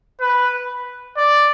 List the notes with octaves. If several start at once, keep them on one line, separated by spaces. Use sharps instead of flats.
B4
D5